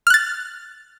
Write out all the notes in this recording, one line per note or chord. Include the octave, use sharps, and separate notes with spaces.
F6 F#6 A6